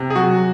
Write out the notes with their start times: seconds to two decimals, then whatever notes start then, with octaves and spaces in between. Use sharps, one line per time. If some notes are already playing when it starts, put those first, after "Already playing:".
Already playing: C3
0.10 G#4
0.15 F#3 F#4